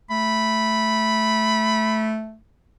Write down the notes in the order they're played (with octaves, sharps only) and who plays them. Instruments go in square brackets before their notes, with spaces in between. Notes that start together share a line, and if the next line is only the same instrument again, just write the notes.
[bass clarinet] A3 [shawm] B5